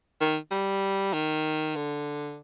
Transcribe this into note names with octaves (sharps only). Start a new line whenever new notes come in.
D#3
G3
D#3
D3